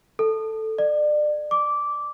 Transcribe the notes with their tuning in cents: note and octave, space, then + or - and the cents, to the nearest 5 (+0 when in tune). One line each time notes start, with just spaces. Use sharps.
A4 +5
D5 +30
D6 -10